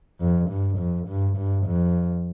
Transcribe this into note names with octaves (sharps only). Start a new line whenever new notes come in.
F2
G2
F2
G2
G2
F2